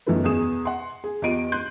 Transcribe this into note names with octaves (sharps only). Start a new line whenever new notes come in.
F#2 D#3 E3 A3 B3
E2 B2 G#4 D#6 E7
F#5 C6
G#4
E2 F4 G4 D#5 D7 D#7
C6 F#6 G6